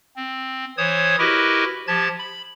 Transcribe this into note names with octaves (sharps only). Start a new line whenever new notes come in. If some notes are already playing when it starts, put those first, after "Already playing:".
C4
E3 C5 C#5 D#6 G#6
E4 F#4 G4 A#4 B4 D#5
F3 G4 A5 G#6 A6
B5